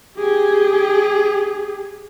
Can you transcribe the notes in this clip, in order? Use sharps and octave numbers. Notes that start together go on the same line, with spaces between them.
G4 G#4